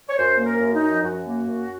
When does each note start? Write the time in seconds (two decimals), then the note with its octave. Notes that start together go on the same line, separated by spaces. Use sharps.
0.08 C#5
0.17 F#2 C5
0.38 A#3
0.46 A#4
0.60 F#2
0.74 D#4
0.82 F3
1.03 F#2 F#4
1.26 A#3
1.46 F#2